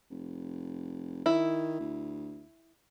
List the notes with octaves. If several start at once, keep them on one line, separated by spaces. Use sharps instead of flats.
F1
D#3 E4
D2